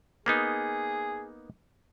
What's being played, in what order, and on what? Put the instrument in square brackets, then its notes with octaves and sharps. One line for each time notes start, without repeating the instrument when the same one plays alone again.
[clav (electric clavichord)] A#3 B3 D#4 [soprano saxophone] G#4